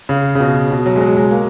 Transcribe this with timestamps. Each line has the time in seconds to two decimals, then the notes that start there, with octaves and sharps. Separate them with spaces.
0.09 C#3
0.35 C#3
0.40 B2
0.71 B2
0.86 F#3
0.96 G#3
1.01 F#3
1.17 G#3
1.31 A#3